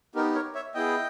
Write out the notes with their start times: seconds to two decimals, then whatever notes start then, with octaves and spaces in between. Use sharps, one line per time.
0.15 B3 D#4 G4 A#4
0.35 A#4 C#5
0.55 C#5 E5
0.74 B3 E4 G#4 D#5 G5